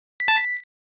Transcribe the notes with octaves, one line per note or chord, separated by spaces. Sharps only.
B6
A5
B6